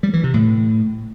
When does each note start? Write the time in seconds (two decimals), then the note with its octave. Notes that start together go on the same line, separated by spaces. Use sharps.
0.03 G3
0.13 E3
0.24 C3
0.34 A2